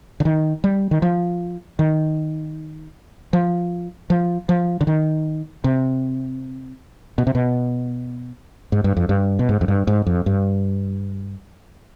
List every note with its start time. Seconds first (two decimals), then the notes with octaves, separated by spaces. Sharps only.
0.20 D3
0.25 D#3
0.64 G3
0.91 D#3
1.02 F3
1.79 D#3
3.33 F3
4.10 F3
4.49 F3
4.81 D3
4.87 D#3
5.64 C3
7.18 B2
7.27 C3
7.35 B2
8.72 G#2
8.84 G2
8.97 F2
9.09 G2
9.39 B2
9.49 G#2
9.61 F2
9.68 G2
9.87 G#2
10.06 F2
10.26 G2